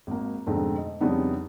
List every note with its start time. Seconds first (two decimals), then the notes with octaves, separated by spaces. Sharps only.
0.07 G#1 A#3
0.47 F2 G#2 B2 D3 A3 C4
0.78 D#5
1.01 F2 C#3 G3 B3 D4 D#4